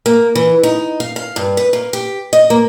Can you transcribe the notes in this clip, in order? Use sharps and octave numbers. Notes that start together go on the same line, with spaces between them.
A#3
E3
D#4
F5
F5
G2
B4
A#3
G4
D#5
A#3